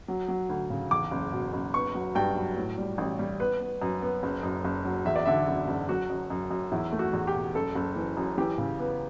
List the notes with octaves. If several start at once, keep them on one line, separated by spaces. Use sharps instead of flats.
F#3
F#3
D2
C#3
E2 D6
F#1
B2
F#1
B3 C#6
F#3
G2 G5
F#3
A2
G3
A1
G3
B3 B4
B3
F#2
B3
F#1
F#2
F#1
F#3
E2 E5
D5
D3 E5
F#1
F#1
F#3 F#4
F#2
F#2
F#2
E2 E4
A3
F#4
E2
G4
B2
F#1 A4
F#1
E3
F#2
E3 G4
C#3
B3